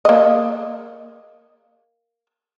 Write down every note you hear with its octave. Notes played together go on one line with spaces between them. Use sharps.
A#3 D#5